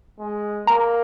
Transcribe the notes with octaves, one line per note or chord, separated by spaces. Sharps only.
G#3
A#3 A#5